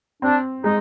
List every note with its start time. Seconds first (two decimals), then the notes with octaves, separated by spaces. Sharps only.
0.22 C4 D4
0.64 G#3 D#4